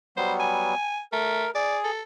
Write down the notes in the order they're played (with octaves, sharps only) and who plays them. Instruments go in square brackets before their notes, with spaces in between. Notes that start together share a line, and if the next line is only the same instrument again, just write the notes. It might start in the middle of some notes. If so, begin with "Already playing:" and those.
[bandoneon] F#3 G3 B3 [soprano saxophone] C5
[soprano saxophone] G#5
[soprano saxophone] A3 [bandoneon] A#4
[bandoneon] G#4 [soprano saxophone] D5
[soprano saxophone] A4